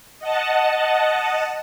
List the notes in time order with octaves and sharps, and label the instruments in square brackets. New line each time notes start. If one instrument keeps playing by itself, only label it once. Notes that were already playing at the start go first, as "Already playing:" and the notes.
[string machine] D#5 F#5 A5